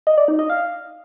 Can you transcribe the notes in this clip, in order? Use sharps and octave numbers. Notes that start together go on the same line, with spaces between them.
D#5
D5
D#4
D#5
F5